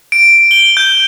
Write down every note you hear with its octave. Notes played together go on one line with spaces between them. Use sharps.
D7
G7
G6